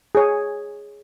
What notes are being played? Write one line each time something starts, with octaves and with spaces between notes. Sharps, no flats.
G#4 C#5